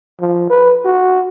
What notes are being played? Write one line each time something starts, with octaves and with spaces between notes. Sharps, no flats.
F3
B4
F#4